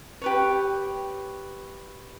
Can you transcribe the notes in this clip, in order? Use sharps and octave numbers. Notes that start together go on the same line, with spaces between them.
G4 B4 C#5